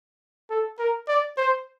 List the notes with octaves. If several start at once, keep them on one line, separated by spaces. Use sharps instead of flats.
A4
A#4
D5
C5